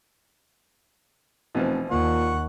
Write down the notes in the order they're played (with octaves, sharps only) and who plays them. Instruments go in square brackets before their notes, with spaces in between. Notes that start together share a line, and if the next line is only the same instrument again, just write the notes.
[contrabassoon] F1 [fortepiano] B2 E3 F3
[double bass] D#2 [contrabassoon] A#2 [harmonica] F#5 C#6